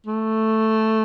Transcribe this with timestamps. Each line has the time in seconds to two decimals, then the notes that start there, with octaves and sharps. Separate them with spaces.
0.06 A3